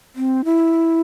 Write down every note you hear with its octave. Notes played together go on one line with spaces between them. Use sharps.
C4
E4